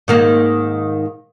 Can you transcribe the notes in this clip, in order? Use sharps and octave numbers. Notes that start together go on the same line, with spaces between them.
G#2 D#3 A#3